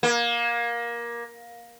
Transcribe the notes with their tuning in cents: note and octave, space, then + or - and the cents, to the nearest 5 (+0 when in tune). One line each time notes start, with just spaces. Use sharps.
A#3 +20